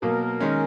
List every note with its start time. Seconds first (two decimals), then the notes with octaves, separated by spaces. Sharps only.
0.02 B2 F#3 A#3 A#4
0.40 D#3 G#3 C#4